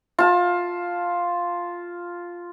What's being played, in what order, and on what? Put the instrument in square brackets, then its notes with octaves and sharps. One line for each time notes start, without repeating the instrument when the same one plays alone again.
[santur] F4 A5